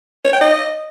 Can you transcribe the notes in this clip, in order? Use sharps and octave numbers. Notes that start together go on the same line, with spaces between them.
C#5
G5
D#5